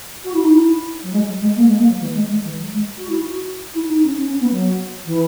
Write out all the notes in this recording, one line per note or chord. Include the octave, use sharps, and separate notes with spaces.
F#4
E4
D#4
E4
F#3
G#3
F#3
G#3
A#3
G#3
A#3
F#3
E3
G#3
G#3
E3
F#3
G#3
F#4
E4
F#4
E4
D#4
C#4
C#4
C#4
B3
F#3
E3